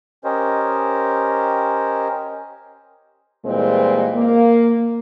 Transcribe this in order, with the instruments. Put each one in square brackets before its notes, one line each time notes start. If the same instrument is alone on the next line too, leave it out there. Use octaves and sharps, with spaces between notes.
[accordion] C#4 G4 A#4 C5 C#5 D#5
[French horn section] A#2 E3 G3 G#3 C4
A#3